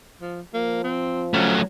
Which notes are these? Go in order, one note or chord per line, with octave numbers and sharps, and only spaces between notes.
F3
F3 A#3
C4
F#3 A3 C#4